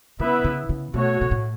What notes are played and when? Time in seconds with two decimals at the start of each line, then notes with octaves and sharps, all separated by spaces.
0.20 C#3 B3 E4 B4 E5
0.44 C#3
0.69 C#3
0.94 B2 A3 F#4 C#5
1.21 B2
1.31 A2